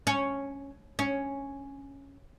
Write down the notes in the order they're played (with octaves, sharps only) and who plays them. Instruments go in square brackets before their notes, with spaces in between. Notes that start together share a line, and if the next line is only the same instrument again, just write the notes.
[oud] C#4
C#4